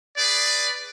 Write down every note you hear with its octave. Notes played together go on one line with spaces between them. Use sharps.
G#4 B4 D5